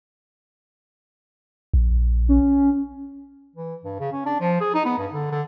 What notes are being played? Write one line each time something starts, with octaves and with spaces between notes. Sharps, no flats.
A#1
C#4
E3
G2
C#3
C#4
D4
F3
G#4
D#4
B3
G2
D3
D3